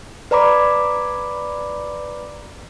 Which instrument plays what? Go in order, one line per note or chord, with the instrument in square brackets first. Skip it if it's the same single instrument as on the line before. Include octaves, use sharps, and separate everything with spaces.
[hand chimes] B4 D5 A#5 B5 D6